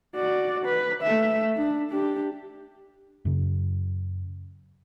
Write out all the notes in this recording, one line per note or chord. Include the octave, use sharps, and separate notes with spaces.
F#4 D5
B4
A3 E5
D4
D4 G4
F#2 C#3